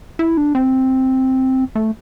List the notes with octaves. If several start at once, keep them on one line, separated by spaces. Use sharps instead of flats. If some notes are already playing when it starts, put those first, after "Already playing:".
E4
D4
C4
A3